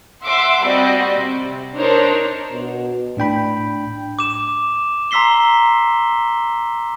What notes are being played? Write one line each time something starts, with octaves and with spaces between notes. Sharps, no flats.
E5 F#5 C6 D6
G3 C4 F#4 D5 D#5
C3
D4 D#4 A#4 C5 C#5
B2
A2 D4 G5 B5
D6 E7
A#5 C6 E6 B6 C7 G7